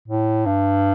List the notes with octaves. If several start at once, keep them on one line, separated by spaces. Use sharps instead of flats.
A2
G2